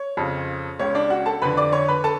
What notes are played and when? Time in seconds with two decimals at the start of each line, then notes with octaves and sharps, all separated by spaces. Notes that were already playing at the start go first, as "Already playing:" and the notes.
Already playing: C#5
0.17 F2 C#3
0.79 C#2 C#3 C#5
0.95 D4 D5
1.10 F#4 F#5
1.26 A4 A5
1.42 F2 D3 B4 B5
1.57 D5 D6
1.72 C#5 C#6
1.88 B4 B5
2.04 A4 A5